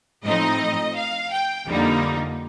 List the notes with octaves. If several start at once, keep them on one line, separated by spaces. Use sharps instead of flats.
A2 F3 C4 D#4 D#5
F5
G5
F2 D3 G3 A#3 D#4